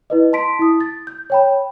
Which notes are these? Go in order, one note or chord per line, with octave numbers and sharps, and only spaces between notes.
E4 B4 D#5
A5 C6 B6 D7
E4 D#6
A6
G6
C#5 G5 B5